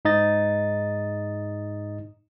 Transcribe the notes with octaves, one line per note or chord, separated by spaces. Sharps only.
G#2 D#4 D#5 A6